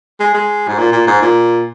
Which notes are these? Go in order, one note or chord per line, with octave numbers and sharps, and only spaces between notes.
G#3
G#3
G#2
A#2
A#2
G#2
A#2